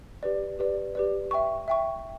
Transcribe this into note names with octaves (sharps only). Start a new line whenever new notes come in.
G4 B4 D5
G4 B4 D5
G4 B4 D5
E5 G5 C#6
E5 G5 C#6